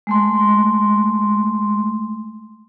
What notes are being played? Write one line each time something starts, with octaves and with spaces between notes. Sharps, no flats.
G#3 A3 C6